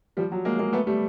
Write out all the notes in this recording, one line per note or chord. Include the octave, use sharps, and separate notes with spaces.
F3 G3
F#3
G#3 A#3
G#3 A#3
A3 B3
G3 A3